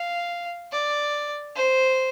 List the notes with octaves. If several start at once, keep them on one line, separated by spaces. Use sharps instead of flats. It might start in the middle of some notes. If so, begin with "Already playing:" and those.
Already playing: F5
D5
C5